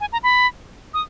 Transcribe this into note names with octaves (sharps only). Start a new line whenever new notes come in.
G#5
A#5
B5
D#6